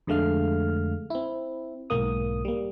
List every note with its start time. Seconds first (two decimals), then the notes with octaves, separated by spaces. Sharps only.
0.07 F2 D3 G#3 A3 F5 F6
1.10 C4 E4
1.90 B1 G#2 A#3 D#6
2.45 G3 A#3